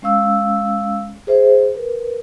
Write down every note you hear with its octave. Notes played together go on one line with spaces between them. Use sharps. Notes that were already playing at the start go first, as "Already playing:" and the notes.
G#3 C#4 F5 E6
G#4 C5 E5
A#4 B4